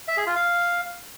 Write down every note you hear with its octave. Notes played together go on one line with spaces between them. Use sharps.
E5
G#4
F4
F5